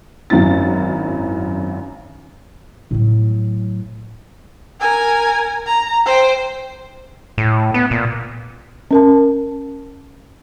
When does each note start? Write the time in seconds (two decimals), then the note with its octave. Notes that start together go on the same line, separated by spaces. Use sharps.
0.30 G#1 F#2 F#3 C#4 E4 A6
2.91 A2 F#3
4.80 A#4 G#5
5.66 A#5
6.06 C5 G5
7.38 A2
7.74 B3
7.91 A#2
8.91 C#4 A#4 A5